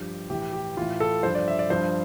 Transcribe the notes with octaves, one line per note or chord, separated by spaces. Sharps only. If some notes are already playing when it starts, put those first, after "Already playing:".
Already playing: G2 F3 G4
A2 E3 G4
G4
A2 E3 F4
A4
G2 F3 C5
D5
E5
D5
G2 F3 C5